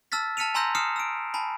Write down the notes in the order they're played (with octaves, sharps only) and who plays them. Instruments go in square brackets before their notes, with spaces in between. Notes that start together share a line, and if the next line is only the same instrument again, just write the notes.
[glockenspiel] A5 E6 F6 A6 B6
A5 F6 B6 C#7 D#7 F7
G#5 A#5 C6 E6 G6 A#6
D#6 F6 C7 C#7 E7
E6 D7
G#5 A5 B5